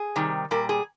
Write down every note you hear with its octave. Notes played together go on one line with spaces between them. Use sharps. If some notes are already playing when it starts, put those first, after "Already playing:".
Already playing: G#4
C3 D#3 G3
A#2 G3 A#4
G#4